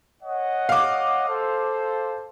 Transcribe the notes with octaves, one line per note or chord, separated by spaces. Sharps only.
C#5 D#5 F#5
F5 D6
A4 C5